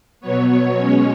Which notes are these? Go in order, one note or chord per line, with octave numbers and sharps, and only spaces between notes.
B2 F#3 B3 C#5
C#5
B2 G#3 C#4